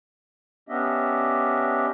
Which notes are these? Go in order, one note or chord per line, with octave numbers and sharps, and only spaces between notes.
B3 C#4 D4 G4 D#5 E5